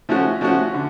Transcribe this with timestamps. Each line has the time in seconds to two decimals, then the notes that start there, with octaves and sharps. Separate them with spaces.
0.09 F3 A3 C#4 F#4
0.41 F3 A3 C#4 F#4
0.74 D3